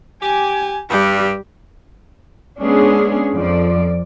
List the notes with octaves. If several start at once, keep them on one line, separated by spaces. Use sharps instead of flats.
G4 G#5
G2 G3 G4
G#3 B3 C#4 D4 G#4
F2 F3 D5